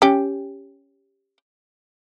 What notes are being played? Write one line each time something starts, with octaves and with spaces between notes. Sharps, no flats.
C#4 G4